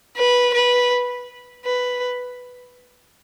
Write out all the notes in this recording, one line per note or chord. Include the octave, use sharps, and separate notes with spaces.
B4
B4
B4